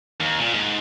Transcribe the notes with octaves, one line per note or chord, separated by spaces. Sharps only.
D#2
A#2
G#2